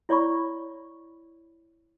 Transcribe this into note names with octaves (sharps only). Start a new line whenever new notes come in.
E4 C#5 D5 B5 C#6